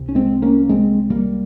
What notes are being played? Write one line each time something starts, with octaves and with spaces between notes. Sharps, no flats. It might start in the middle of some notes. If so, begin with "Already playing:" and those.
Already playing: C2
C#4
G#3 C4
A#3 C#4
G#3 C4
G3 A#3